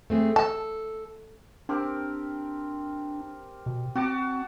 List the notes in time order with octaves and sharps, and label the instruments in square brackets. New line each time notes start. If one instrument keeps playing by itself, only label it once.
[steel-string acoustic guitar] A3 C4 G#4
[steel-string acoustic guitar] A4 [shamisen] A5
[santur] C4 G4 A#4 [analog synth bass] D4
[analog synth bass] B2
[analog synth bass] C4 [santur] F#4 A5 D6